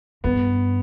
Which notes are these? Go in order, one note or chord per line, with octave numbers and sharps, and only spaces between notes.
G2 B3